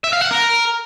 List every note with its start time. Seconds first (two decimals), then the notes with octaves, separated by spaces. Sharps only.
0.04 E5
0.13 F5
0.22 F#5
0.31 A#4